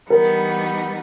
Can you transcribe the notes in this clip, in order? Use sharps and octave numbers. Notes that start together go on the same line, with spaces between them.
E3 G3 B3 D#4 A#4